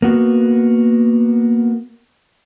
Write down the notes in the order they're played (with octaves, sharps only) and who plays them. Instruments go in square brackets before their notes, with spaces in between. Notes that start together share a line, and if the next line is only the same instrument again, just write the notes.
[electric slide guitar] A#3 B3 F#4